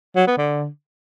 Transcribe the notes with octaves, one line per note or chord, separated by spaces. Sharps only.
F#3
B3
D3